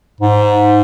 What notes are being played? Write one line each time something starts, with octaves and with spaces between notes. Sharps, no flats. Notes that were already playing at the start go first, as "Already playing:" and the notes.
G#2